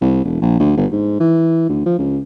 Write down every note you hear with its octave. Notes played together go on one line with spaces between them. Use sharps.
C2
E1
A#1
D2
G1
G#2
E3
D2
F3
C#2